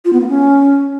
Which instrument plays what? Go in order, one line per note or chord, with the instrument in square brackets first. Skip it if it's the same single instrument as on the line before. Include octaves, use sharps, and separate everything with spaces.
[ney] F4
B3
A#3
C#4